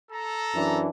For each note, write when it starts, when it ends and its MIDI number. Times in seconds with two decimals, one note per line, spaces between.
0.10 0.80 69
0.10 0.80 82
0.54 0.88 42
0.54 0.88 52
0.54 0.88 62